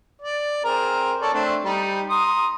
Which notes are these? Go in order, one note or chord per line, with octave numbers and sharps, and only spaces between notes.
D5
C4 G#4 A#4
A4 C#5 D5
A3 C4 D4
G3 D#4
A#5 C6 D#6